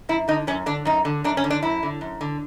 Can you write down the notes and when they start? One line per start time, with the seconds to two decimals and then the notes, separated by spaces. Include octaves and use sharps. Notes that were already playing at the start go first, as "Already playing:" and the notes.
0.09 F#2 E4
0.28 D3 D#4
0.47 F#2 C#4
0.66 D3 D4
0.85 F#2 D#4
1.05 D3
1.24 F#2 D4
1.37 C#4
1.44 D3
1.50 D4
1.63 F#2 E4
1.83 D3
2.01 F#2
2.21 D3